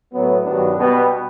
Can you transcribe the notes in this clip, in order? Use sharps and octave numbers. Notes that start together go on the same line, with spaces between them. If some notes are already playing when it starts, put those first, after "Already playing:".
A2 F#3 B3
G2 D#3 F#3 B3 D4
B2 G3 B3